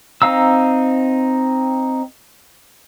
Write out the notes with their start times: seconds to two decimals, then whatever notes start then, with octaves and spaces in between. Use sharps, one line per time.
0.22 C4 D#4 F5 A#5 E6